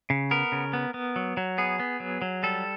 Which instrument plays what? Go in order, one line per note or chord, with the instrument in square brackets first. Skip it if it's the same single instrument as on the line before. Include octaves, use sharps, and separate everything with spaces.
[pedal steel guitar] C#3
B3 A#4
C#3
B3
B3
F#3
F#3
B3 G#4
B3
F#3
F#3
G3 A4